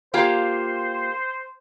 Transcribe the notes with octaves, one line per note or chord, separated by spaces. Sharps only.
A#3 F4 G4 C5